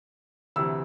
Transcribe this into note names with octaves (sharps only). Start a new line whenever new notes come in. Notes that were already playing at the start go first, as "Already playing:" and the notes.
D2 C3 E3 E6